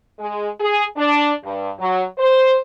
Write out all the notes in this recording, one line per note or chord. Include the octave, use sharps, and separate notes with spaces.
G#3
G#4
D4
G2
F#3
C5